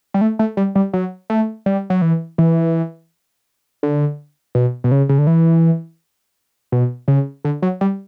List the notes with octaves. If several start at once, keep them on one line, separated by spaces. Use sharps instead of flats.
G3
A3
A3
G3
G3
F#3
A3
G3
F#3
E3
E3
D3
B2
B2
C#3
C#3
D3
E3
B2
C#3
D3
F#3
G3